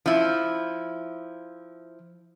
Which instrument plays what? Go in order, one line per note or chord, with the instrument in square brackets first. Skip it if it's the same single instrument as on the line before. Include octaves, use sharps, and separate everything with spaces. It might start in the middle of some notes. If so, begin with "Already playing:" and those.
[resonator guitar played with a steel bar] F3 E4